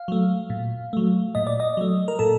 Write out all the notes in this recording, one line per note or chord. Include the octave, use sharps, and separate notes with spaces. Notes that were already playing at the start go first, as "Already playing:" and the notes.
Already playing: F5
F#3 A3
A#2
F#3 A3
A#2 D#5
D5
D#5
F#3 A3
A#4
A#2 A4